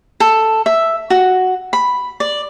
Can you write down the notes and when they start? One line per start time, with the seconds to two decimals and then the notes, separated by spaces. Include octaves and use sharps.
0.20 A4
0.66 E5
1.10 F#4
1.73 B5
2.20 D5